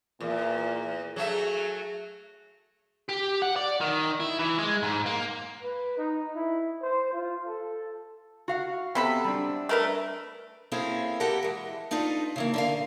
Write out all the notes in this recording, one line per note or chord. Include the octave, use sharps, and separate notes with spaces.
E2 A#2
F#3 A3 G#4 E5
G4
F#5
D5
D#3
E4
E3
G#3
G#2
A#3
B4
D#4
E4
C5
F4
A4
F#4 F5 F#5
C3 B3 A4 B5
G3 D4
A3 A#4 B4
A#3 C4 C#4 E4 G#4 A4
E4 G4 A4 A#4 F#5
E3 G#3
D4 D#4 F4 A4 B4
C#3 E3 A#3
D3 A#4 F5